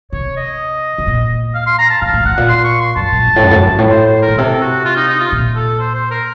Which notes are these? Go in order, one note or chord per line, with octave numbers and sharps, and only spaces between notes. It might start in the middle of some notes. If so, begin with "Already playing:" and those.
C3 C#5
D#5
C3
A#2
F5
C6
A#5
A5
A2 F5
A2
A2 F#5
A#2
C6
C#6
C6
F#2 A5
A#2
F#2
A2
F#2
A2
F#2
F#2
A2
C5
C5
A#4
A#2
C3 A4
F#4
F4
D#4
D#4
F4
A#2
A4
C5
C5
A#4